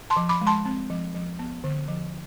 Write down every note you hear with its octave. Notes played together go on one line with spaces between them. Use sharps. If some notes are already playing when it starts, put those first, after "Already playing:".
A5 C6
F3
B5 D6
G#3
A5 C6
C4
F3
F3
B3
D3
F3